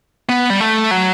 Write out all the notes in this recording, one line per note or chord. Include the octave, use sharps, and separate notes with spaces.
B3
G3
A3
F#3